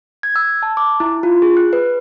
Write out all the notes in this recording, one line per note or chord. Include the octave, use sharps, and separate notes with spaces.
G#6
E6
A5
D6
E4
F4
G#4
F#6
B4